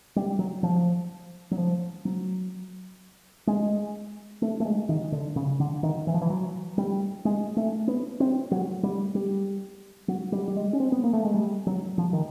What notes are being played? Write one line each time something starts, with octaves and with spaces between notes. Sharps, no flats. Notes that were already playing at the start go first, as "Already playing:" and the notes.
G3
F#3
F3
F#3
F3
F#3
G#3
A3
A3
G#3
D#3
D3
C#3
D3
D#3
E3
F3
E3
F#3
G3
G#3
A3
B3
C4
F#3
G3
G3
F#3
G3
G3
G#3
C#4
C4
B3
A#3
A3
G#3
G3
F#3
F3
D#3